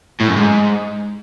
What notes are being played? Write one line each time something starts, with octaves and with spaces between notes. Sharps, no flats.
A2
F#2
G#2